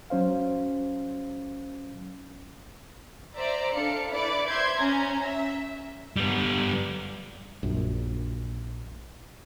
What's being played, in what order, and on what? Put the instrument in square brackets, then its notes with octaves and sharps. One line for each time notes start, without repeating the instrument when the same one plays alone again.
[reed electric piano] F#3 C#4 C5 F5
[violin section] C5 D5 E5 A#5
D4 A4 F5 C#7
E4 B4 D5 D6
C5 E5 C6 G6 G#6
C#4 G#5 A#5
E5
[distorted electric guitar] G3 B3
[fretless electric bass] A#1 F#2